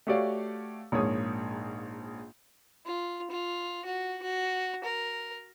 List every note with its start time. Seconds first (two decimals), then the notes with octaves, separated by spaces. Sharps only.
0.07 A3 F#4 G4 C#5 D5 F5
0.92 A#1 G#2 A#3 C#5 D#6
2.85 F4
3.30 F4
3.85 F#4
4.22 F#4
4.84 A#4